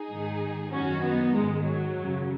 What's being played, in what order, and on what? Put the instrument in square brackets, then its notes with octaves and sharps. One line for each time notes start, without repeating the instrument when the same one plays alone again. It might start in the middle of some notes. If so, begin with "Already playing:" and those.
Already playing: [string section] D#4 G#4
G#2 D#3
F#2 D#3 C#4 F#4
B3 D#4
G#2 D#3 G#3
F#3
F#2 C#3